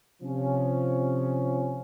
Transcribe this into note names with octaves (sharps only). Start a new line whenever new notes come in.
C3 F3 C#4